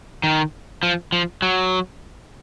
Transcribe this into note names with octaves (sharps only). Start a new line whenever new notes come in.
D#3
F3
F3
F#3